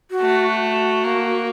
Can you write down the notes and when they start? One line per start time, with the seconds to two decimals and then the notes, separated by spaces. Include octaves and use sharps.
0.11 F#4
0.21 A3
0.62 F#4
1.04 A#3